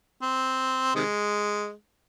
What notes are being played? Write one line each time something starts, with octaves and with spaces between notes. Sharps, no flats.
C4
C3 D#3 G#3